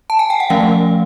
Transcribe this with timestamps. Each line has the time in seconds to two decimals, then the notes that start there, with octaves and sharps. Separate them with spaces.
0.10 A5
0.19 G#5
0.30 G5
0.40 F#5
0.50 F3 A3 C#4 F5